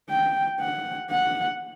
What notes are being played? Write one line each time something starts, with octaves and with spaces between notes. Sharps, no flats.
G5
F#5
F#5